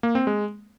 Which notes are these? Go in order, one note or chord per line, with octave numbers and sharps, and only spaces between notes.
A#3
C4
G#3